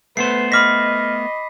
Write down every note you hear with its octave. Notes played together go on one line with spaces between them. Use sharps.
A3 B3 B4 C5 C7
D#5 B5 D6 F6 A#6 B6